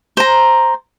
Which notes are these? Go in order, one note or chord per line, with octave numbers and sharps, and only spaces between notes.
C5 A#5